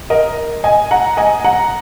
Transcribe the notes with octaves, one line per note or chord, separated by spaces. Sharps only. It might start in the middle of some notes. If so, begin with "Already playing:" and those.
A#4 D#5
D#5 G#5
F#5 A#5
D#5 G#5
F#5 A#5